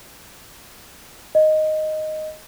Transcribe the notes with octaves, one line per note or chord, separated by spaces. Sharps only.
D#5